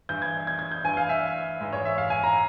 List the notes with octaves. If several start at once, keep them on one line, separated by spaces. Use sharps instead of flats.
G2 E3 G6
G#6
G#6
G#6
G6
G2 E3 G#5
F5
E5
G#2 E3
C#5
E5
F5
G#5
A#5